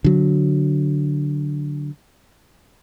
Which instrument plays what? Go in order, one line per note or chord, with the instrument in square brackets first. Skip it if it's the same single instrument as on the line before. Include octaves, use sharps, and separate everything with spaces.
[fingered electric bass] D3 F#3